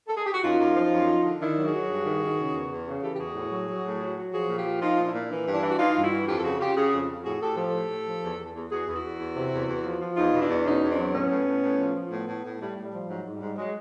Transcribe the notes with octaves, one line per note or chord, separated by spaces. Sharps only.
A4
G#4
G4
F#4
F#2 D#4 F4
F#2
F3
F#2
F3
D3
D#3 D4 E4
F#3
F#4 G#4
F#3
G2
D#3
D#3
C#3
E2
E2
C#3 F#4 G#4
E3 G4 A4
G4
E2 F#4 G#4
A2
F#3
F#3
A2
F#3
F#3
F3 F#4 G#4
A#2
F4 G4
F3
F3 D#4 F4
A#2
D4 E4
A#2
E3
G2
D4 E4
E3
F#4
E3 D#4 F4
G2
E4 F#4
E3
F2 F4 G4
A4
C#3 F#4 G#4
C#3 F4 G4
C#3 F#4 G#4
F2
F2
A2 F#4 G#4
A2 G4 A4
F3 G4 A4
A2
A2
F3
E2
E2
E2
E2 F#4 G#4
E2
E4 F#4
E2
E2
C3
E2
E2
F3
F3
E2 D#4 F4
B2
D4 E4
E2
B2 C#4 D#4
E2
C4 D4
F#3
A2 B3 C#4
A2
A2
A2
F3
F3
A2 A3 B3
A2
A2
A2 G3 A3
A2
G3
F3
G#2 F#3
G#2
G3
G#2
F#3 G#3